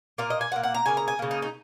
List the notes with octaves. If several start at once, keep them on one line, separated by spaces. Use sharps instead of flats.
A#2 A#3 A#4
D#5
G#5
A#2 A#3 F#5
F#5
A#5
C#3 A#3 G#5
A#5
G#5
C#3 A#3
D#4
D#4